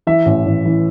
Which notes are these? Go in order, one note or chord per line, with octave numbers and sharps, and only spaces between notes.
E3 E5
A1
A1
E3